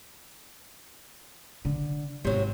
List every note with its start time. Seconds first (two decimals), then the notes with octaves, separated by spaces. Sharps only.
1.65 D3
2.25 G#1 C3 F#3